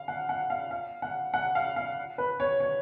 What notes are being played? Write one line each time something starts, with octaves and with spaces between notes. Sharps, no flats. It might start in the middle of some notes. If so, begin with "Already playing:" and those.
Already playing: F5
F#5
F#5
F5
F5
F#5
F#5
F5
F5
B4
C#5
C#5